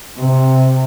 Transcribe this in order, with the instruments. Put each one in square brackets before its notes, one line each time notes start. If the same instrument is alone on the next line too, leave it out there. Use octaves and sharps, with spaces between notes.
[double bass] C3